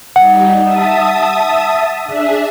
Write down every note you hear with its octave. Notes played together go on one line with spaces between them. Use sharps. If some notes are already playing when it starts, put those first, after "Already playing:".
G3 D#4 F#5
E5 A5 D#6
D4 G#4 E5